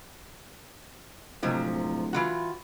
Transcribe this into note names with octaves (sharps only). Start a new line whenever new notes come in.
D1 G#2 C3 F3
E3 F4 F#4